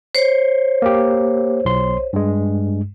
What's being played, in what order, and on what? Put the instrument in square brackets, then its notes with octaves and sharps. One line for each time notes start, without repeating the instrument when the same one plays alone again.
[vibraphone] C5 C#5
[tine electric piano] A#3 G4
B1 C6
G2 G#3